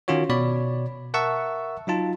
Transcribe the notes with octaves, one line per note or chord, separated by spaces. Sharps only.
D#3 C#4 F4 F#4 C#5
B2 C#5 D5 B5
A#4 E5 F#5 A5 C#6 E6
F#3 D#4 F4 A5